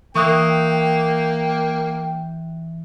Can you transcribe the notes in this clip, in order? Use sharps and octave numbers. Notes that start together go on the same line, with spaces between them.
E3 A#3 E5 G5 C#6 D#6 E6 F#6